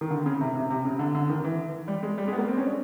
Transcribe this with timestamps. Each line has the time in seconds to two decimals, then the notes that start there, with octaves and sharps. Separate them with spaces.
0.01 D#3
0.10 D3
0.26 C#3
0.41 C3
0.55 C3
0.70 C3
0.85 C#3
0.99 D3
1.15 D3
1.29 D#3
1.44 E3
1.88 G3
2.03 G#3
2.18 G3
2.28 G#3
2.33 B3
2.38 A#3
2.48 C4
2.57 C#4
2.67 D4